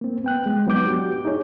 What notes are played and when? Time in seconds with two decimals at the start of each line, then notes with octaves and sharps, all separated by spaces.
0.01 A#3 C4
0.24 B3 G5 F#6
0.46 G#3
0.67 F#3 B3 D#4 D6 G6
0.87 D4 F#4 G4
1.25 D#4 E4 G#4 C#5